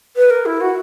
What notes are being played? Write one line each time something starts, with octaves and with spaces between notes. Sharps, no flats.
B4
A#4
E4
F#4